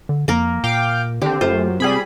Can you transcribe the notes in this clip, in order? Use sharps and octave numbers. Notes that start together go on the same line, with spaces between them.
D3
F2 A#3 A#4
A#2 F5 G5 D6
D3 D#3 C4 G4
F#2 A3 F4 C5
C3 G3 G#4 B5